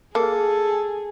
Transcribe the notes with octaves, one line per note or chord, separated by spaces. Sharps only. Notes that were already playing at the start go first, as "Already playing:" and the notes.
A#3 G#4 A4